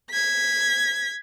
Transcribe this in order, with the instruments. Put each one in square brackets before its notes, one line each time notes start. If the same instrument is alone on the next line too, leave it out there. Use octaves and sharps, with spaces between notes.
[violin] G#6 B6